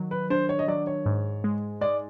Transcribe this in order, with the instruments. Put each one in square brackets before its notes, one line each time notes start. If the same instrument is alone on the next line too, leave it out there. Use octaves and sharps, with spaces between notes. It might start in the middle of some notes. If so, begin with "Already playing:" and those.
Already playing: [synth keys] D#3 F#3
[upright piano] B4
[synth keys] D4 [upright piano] C5
[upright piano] C#5
D#5
[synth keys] F#3 [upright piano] D5
[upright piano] C#5
[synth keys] G#2
G#3
[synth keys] G#3 [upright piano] D5